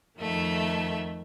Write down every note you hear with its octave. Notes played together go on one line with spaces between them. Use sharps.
F2 D#3 A3 E5